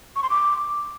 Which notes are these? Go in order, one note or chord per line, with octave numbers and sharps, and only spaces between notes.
C#6
C6
D6